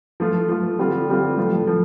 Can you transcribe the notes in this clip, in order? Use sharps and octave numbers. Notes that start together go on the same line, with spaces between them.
F3 A3 F4
F3 A3 F4
D3 G3 C4 F4
D3 G3 C4 F4
A2 F3 A3 F4
A2 F3 A3